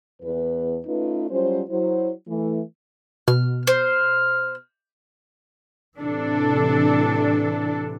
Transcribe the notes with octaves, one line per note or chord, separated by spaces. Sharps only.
E2 B4
A3 C#4 D#4 F4 B4
F#3 G3 C#4 F4 C5
F#3 E4 C5
E3 A3
B2 F6
C5 F6
A2 C3 E3 D4 A4